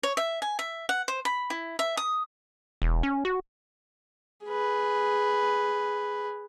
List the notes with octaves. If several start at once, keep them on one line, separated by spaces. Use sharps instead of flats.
C#5
E5
G#5
E5
F#5
C5
B5
E4
E5
D#6
E1
C#4
F#4
G#4 B4